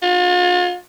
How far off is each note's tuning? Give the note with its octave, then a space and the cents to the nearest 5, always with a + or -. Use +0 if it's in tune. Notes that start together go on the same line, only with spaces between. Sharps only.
F4 +40